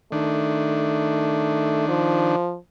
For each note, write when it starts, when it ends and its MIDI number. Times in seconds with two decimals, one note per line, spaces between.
0.12 2.36 51
0.12 1.86 57
0.12 2.36 62
1.89 2.56 53